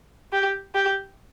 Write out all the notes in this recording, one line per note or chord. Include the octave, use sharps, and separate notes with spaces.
G4
G4